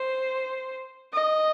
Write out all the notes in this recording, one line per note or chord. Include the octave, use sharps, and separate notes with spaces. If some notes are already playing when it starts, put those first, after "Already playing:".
Already playing: C5
D#5